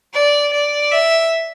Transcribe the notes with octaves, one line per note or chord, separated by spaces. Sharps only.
D5
D5
E5